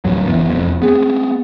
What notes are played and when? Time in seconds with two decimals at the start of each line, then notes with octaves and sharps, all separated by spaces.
0.05 D1 G2 F#3
0.27 F#1 E3 B3
0.50 E1 F2
0.82 B3 C4 G#4